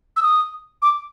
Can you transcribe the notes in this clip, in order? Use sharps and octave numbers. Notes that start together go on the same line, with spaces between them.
E6
D#6
D6